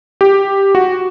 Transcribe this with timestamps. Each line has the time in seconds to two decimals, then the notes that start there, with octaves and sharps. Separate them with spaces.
0.21 G4
0.75 F#4